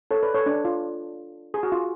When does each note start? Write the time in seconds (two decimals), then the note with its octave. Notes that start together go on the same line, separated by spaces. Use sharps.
0.11 A4 C#5
0.23 B4 D5
0.34 A4 C#5
0.46 D4
0.65 F4
1.54 G#4
1.63 F#4
1.72 F4